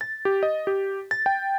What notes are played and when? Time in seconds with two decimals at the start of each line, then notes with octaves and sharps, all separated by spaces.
0.01 A6
0.25 G4
0.43 D#5
0.67 G4
1.11 A6
1.26 G5